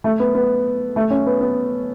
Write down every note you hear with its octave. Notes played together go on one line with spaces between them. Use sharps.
A3
B3
B3
A3
C#4
B3
B3